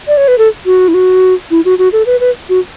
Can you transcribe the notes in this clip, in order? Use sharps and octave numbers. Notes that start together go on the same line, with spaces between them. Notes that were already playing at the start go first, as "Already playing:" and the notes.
D5
C#5
B4
A4
F#4
E4
F#4
E4
F#4
F#4
A4
B4
B4
F#4